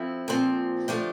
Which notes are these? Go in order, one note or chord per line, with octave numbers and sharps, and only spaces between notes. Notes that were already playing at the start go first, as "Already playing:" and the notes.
Already playing: F3 C4 E4 A4
A#2 F3 C4
D3 F3 A3 D4 G4